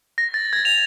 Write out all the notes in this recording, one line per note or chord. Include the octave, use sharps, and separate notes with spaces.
A#6
A6
G#6
F7